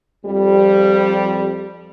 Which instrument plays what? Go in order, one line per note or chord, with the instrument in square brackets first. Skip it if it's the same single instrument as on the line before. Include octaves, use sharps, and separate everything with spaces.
[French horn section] F2 G3